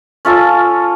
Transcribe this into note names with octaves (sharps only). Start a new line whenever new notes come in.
C#4 F4 A4